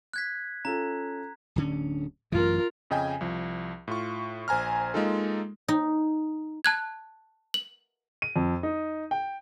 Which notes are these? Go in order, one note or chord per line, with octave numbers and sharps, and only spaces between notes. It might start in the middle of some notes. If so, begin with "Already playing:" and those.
F#6 G#6 B6
C#4 F4 A4 A#5
D1 D3 C#4
A1 F#2 E3 F4 A#4
F2 C#3 D#5 G5 G#5
C2 F3
A2 F4 C#6
A#1 C5 G#5 A#5 F6
G#3 A#3 D#4 F4 A4
D#4
A5 F#6 G#6
F#7
D#7
F2
D#4
G5